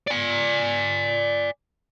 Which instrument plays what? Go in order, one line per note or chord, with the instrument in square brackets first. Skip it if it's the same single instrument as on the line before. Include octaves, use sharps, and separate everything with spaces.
[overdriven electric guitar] D5 G#5